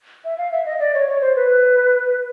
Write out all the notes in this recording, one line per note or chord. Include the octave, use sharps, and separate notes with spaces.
E5
F5
E5
D#5
D5
C#5
C#5
C5
B4